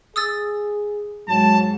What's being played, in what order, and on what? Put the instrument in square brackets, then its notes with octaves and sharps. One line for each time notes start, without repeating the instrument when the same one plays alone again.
[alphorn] G#4 [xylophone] D#6 E6 A6
[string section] G#2 [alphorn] F#3 [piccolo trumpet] A5